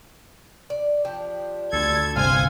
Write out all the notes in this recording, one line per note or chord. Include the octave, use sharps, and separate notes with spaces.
D5
F3 D4 G4
D2 A4 G#6
G1 C2 B3 C5 F5 G#5 G#6